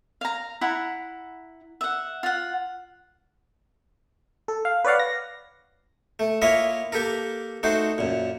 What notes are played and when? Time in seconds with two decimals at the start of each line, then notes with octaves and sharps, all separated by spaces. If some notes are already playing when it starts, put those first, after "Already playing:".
0.21 F5 A#5
0.61 E4 F#5 A#5
1.81 E5 F#5
2.23 F4 F#5
4.48 A4
4.65 F5
4.85 B4 C#5 D5 F5 F#5
4.99 A#6
6.19 A3
6.42 A#3 E4 F4 C#5 D#5 E5
6.92 A#3 G4 A4 A#4
7.63 A3 D#4 F#4 C5
7.98 F#2 A#2